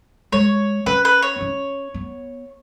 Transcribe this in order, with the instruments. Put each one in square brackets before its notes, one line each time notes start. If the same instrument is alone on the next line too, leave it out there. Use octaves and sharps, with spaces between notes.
[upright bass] G#3 [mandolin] C#5
[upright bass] C#4 [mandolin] B4
[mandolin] B4
C#5
[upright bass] B3
C#4
B3